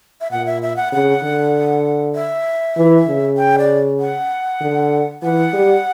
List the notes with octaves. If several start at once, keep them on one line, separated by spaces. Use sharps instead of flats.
E5
A#2 F#5
E5
E5
F#5
C#3 F#5
D3
E5
E3
C#3
G5
D5
F#5
D3
E3 F#5
G3